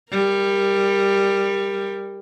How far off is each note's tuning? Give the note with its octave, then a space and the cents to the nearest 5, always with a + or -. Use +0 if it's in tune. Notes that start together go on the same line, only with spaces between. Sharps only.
G3 +15 A#4 +0